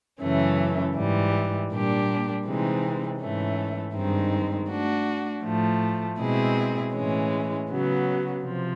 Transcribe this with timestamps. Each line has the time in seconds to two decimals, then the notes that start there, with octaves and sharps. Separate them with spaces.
0.21 F#2 C#3 E3 A3 C#4
0.96 G#2 E3 G3
1.71 A#2 G3 A#3 D4 G4
2.46 C3 E3 G#3 C4 D#4
3.21 G#2 E3 A3 C#4
3.96 G2 D#3 G#3 C4 D#4
4.70 A3 D4 F#4
5.45 A2 F3 A3
6.20 B2 G#3 C4 E4 G#4
6.95 A2 E3 G#3 C#4
7.70 C#3 F#3 B3
8.44 C3 F3